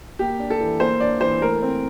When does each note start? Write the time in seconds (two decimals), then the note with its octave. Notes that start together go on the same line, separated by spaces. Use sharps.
0.19 A#3 G4
0.40 D4
0.50 A4
0.60 E3
0.80 A#3 C5
1.00 D4 D5
1.21 E3 C5
1.41 A3 A#4
1.62 C4